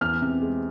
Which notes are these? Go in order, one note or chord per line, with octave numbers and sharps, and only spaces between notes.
E2 F6
C3
G#3